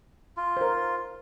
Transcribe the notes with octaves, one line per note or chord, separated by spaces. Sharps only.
F4
A#4 C5